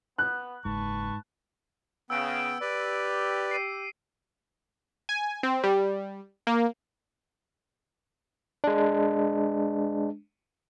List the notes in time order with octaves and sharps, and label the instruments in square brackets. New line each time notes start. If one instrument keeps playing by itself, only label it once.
[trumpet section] B3 [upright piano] F#6
[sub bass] F#1 [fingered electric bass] G#2 [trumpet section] B4 A5 C#6
[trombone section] C#3 [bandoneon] B3 G5 [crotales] E6 D7
[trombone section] G4 [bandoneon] B4 D5
[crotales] C7 D#7
[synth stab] G#5
C4
G3
A#3
[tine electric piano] G#3 D4